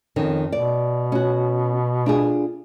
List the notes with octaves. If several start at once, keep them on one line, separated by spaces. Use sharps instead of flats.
F2 D#3 C#4
B2 D5
C#4 F#4
D4 F4 G#4